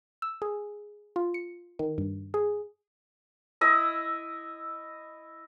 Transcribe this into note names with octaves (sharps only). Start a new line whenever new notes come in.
E6
G#4
F4
C#7
D#3
G2
G#4
E4 D#5 E6